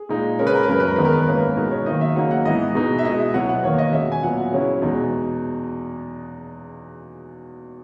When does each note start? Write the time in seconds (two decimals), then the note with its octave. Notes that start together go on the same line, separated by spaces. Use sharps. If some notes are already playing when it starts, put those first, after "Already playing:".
Already playing: G#4
0.09 A#2 G#3 D#4
0.39 C#3 G#3 C#4 A#4
0.47 B4
0.55 A#4
0.63 B4
0.68 F#2 C#3 G#3 A#4
0.80 B4
0.88 A#4
0.96 E2 D#3 G#3 B3 D#4 B4
1.05 A#4
1.12 B4
1.21 A#4
1.27 G#2 E3 A#3 C#4 E4 B4
1.38 A#4
1.57 B2 G#3 B3 D#4 A#4
1.71 C#5
1.86 D#3 F#3 A#3 D#4 D#5
2.01 E5
2.16 C#3 F#3 A#3 D#4 F#5
2.31 F#5
2.45 G#2 E3 B3 E4 D#5
2.75 B2 G#3 B3 D#4
2.98 E5
3.05 B2 G#3 B3 E4 D#5
3.19 E5
3.34 B2 F#3 B3 E4 F#5
3.49 F#5
3.63 E2 D#3 A#3 C#5
3.78 D#5
3.92 B2 G#3 C#4 E5
4.12 G#5
4.23 A#2 F#3 B3 F#5
4.52 C#3 F#3 C#4 E4
4.82 E2 B2 G#3 D#4